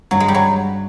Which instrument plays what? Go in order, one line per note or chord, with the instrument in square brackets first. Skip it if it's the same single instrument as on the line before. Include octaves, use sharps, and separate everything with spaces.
[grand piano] G2 [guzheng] F#3
[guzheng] G#3
G3
F#3